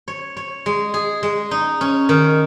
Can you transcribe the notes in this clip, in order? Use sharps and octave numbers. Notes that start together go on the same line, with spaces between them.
C#5
C#5
G#3
G#4
G#3
D#4
C#4
D#3